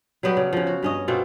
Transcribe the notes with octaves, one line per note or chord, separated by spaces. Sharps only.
F#3 G3 B3 G4
C#3
C#3 F3
F#4
G2 C#4 D#5
B2 C4 F4 A4